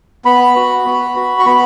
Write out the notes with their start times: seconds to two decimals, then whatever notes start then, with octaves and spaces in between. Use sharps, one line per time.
0.25 B3 B5
0.56 F#4
0.85 B3
1.15 F#4
1.39 C#6
1.46 B3 B5